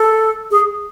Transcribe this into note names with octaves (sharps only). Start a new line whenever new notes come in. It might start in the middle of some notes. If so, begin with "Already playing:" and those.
Already playing: A4
G#4